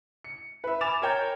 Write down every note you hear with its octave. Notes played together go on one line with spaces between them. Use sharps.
C#7
B4 E5
G#5 B5 D6 A6 E7 F7
A#4 C#5 G5 A#5 G6